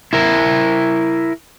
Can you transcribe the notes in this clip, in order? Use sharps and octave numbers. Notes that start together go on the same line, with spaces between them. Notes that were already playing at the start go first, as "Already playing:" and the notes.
E4 A#4